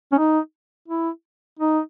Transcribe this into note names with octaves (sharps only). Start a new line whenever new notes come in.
C#4
D#4
E4
D#4